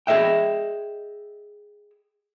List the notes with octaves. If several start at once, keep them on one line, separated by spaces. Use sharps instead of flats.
G#4 A#4 D#5 E5 G5